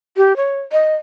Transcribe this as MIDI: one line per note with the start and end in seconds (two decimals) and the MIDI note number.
0.17 0.36 67
0.36 0.61 73
0.72 0.95 75